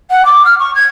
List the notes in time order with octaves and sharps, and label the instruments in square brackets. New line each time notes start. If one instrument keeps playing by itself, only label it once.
[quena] F#5
D6
F6
C#6
G#6